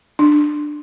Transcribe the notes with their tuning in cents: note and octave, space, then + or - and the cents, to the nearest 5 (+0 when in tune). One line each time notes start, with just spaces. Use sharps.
D4 +20